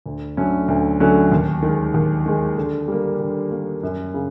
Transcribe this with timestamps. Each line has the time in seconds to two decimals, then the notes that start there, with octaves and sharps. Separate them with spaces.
0.06 D2
0.37 D3 F#3 A3 C#4
0.68 D2
1.00 D3 F#3 A3 C#4
1.32 D#2
1.62 D#3
1.68 G#3
1.94 D#2
2.26 D#3 G#3
2.57 D3
2.88 G3 A#3
3.20 D3
3.51 G3 A#3
3.83 F#2
4.14 C#3